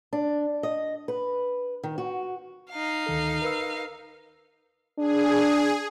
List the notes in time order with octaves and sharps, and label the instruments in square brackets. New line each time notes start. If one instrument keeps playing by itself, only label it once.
[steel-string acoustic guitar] D4
D#5
B4
D#3
F#4
[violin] D#4 F5
[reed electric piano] D2 D#3 A4
A#4 B4 E6
[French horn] D4 [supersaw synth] G#4